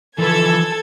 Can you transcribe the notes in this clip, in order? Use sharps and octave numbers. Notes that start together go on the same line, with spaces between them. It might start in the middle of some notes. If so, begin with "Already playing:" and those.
E3 F3 A4 B4 G#6